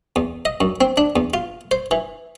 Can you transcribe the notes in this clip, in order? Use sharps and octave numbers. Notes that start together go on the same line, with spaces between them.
E2
D#5
F#2
C4
D4
E2
F4
C5
E3